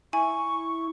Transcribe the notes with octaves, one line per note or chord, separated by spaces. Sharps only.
E4 G#5 C#6